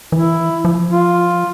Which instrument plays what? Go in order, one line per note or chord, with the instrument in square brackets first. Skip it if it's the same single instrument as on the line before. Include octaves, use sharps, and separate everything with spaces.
[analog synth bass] E3 [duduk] E4
[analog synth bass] F3
[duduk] F4